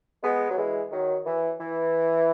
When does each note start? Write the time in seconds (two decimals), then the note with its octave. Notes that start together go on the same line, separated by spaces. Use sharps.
0.23 G#3 B3
0.50 F#3
0.57 E3 G#3
0.91 D#3 F#3
1.26 E3
1.60 E3